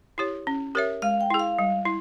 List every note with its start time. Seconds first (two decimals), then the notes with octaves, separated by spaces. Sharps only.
0.18 E4 G4 C#5
0.47 C#4
0.75 G4 A#4 C#5 E5
1.02 G#3 F5
1.21 G5
1.30 E4 G#4
1.39 F5
1.59 G3
1.85 E4